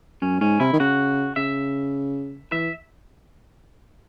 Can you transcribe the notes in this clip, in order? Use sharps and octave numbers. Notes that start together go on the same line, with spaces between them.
F#2 C#4
G#2 C#4
C3 E4
D#3
C#3 F#4
C#3 E5
E3 E5